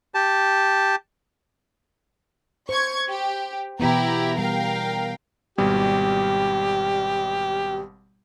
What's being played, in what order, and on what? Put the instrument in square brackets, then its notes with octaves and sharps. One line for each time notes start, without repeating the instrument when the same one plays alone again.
[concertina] G4 A5
[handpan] C5 [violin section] C#6 G#6
[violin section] G4
[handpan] B2 E3 B3 [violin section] E4 G4 A#5
[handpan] G3 [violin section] A#4 F5 G5
[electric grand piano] G#1 B2 G3 [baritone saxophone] G4